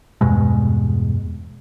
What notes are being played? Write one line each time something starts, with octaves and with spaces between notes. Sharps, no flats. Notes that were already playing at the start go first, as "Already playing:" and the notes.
E2 G2 B2 G#3